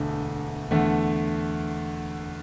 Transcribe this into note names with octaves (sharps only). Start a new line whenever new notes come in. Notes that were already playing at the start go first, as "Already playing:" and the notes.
Already playing: E1 D2 D3 A3
E2 D3 A3